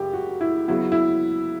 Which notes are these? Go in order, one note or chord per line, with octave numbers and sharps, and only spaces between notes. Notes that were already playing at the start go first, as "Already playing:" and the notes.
Already playing: F#2 C#3 G4
F#4
E4
C#3 F#3 B3 E4
E4